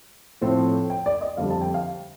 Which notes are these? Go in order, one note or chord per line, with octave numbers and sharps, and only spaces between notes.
A2 F3 A3 C4
G5
D5
D#5
F2 D3 G3 F5
A5
G5
F5